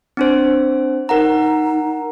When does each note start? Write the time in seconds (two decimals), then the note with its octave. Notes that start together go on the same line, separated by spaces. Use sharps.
0.17 C4 D4 C5
1.09 D#4 A#4 F#5 A#5